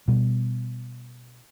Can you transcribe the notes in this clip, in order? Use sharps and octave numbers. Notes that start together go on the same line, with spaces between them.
B2 G3